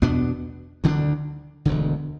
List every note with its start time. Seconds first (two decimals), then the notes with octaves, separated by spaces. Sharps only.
0.02 E2 B2 B3 D4
0.84 D2 D3 B3 D4
1.65 E1 D2 D3